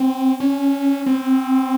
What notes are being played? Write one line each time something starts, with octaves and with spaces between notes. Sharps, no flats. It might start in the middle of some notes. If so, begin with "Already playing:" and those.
Already playing: C4
C#4
C4